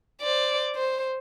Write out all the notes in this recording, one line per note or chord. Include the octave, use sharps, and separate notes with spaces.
C5 D5
C5